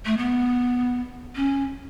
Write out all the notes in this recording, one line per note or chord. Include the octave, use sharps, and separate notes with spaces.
A3
B3
C#4